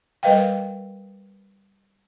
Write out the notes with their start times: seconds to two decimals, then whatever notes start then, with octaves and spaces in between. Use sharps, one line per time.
0.23 G3 A#4 B4 D#5 F5 G5